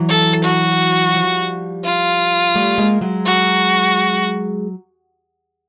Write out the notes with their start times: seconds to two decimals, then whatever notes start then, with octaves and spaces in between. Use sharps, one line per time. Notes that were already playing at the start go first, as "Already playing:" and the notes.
Already playing: E3 F#3
0.09 A4
0.44 F#4
1.15 F3 G3
1.85 F4
2.55 G3 A3
2.78 G#3 A#3
3.01 F#3 G#3
3.25 F#4